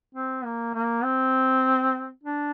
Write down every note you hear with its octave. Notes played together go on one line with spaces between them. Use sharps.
C4
A#3
A#3
C4
D4